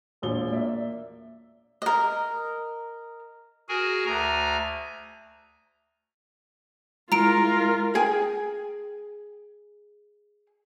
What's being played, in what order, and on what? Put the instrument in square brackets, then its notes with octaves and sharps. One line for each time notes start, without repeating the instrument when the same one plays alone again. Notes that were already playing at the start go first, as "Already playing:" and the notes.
[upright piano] E1 A#1 G7
A#3 D5 E5
[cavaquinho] A#4 D#5
[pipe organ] F#4 G#4 A#4 G#5
D2 G#5 A#5
[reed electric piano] G#3 E4 [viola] F4 A#4 [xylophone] A#5 D7
[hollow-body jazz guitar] G#4 G5 G#5